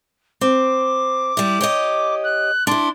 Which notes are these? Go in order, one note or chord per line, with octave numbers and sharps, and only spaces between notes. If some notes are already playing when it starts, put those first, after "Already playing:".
C4 D6
G3 E4
G4 C#5 D#5
F#6
D4 E4 C6